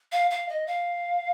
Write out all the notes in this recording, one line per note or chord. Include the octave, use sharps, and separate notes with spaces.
F5
F5
D#5
F5